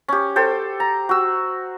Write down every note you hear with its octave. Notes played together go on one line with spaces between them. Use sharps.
C#4 G4
A4 C5 G5
A#5
F#4 E6